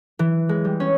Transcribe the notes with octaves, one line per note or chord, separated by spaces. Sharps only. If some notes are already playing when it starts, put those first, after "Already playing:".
E3
G#3
G3
C#4